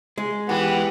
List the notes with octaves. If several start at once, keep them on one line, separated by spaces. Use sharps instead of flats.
G#3
E3 B3 G4 F#5